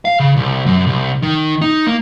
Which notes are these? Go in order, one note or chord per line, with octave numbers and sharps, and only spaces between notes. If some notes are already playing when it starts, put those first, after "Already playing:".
F5
C#3
C2
F#2
C2
D#3
D#4
A#3